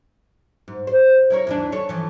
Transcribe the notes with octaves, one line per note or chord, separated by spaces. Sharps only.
G#2
C5
E4 A#4 C#5
D#2 E3 D4
A4 C#5
E3 F3